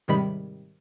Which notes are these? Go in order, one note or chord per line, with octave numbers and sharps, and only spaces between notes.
G#2 C3 D#3 G3 B5